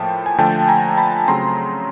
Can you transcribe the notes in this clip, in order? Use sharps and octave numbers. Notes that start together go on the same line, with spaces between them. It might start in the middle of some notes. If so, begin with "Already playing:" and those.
Already playing: A2 F3 A#3 G5 A5
G#5
D3 F3 A3 G5 A5
G#5 A#5
A5 B5
C#3 F#3 A3 C4 A#5 C6